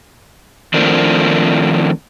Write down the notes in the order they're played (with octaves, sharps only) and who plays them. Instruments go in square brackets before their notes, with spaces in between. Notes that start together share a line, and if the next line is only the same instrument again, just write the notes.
[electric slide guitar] D#3 F3 A3 C4 D4 A#4